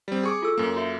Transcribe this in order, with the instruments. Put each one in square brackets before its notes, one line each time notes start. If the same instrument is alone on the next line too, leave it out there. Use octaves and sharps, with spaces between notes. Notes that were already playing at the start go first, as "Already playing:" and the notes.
[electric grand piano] G3 C4
G#4 C#6 D6
[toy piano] F4 A4 E6
[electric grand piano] F#2 A#3
[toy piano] F#4 C#5 E5